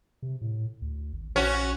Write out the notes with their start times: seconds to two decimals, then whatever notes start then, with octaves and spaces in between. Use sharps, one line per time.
0.22 C3
0.41 A2
0.82 D2
1.13 G#1
1.36 A#1 C#4 F#4